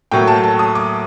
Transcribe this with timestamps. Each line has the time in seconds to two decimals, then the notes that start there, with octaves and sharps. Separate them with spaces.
0.11 A2 F#3 A#3 G5
0.27 A5
0.44 A5
0.59 D#6
0.75 D6